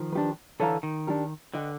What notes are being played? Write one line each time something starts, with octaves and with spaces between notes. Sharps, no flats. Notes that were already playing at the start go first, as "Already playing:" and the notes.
Already playing: D#3 F3
D4 G4 B4
D3 E3 A4 C#5 F5 A#5
D#3
D4 G4 A#4
D3 B4 D#5 G5